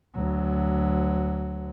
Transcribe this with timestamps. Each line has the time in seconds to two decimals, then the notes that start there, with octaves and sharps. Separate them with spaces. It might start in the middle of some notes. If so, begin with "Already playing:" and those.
0.16 D2 F#3